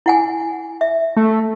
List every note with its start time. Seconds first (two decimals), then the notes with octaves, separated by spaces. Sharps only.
0.06 E4 F#5 G#5
0.81 E5
1.17 A3